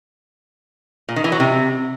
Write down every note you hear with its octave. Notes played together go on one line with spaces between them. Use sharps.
A#2
D#3
E3
F#3
C3